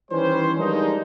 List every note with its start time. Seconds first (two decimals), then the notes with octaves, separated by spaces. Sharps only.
0.11 D#3 E3 G3 C#4 B4 C5
0.58 F3 G3 G#3 A#3 D4 D#4